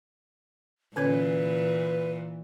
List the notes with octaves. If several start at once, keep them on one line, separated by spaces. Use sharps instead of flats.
A#2 D3 E3 C#4 B4 C#5